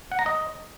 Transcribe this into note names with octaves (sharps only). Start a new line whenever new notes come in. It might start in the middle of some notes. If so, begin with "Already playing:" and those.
F#5
A#5
D#5